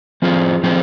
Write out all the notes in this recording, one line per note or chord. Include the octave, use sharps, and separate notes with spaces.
F3 C4 F4 G#4 C5
F3 C4 F4 G#4 C5